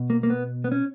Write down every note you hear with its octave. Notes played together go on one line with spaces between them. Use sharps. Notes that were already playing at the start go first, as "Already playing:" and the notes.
Already playing: B2
A#3
A#3
B3
B3
C#4